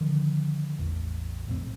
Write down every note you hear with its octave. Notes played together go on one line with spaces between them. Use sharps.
D3 D#3 F3
A1 E2
B1 F2 A2 C4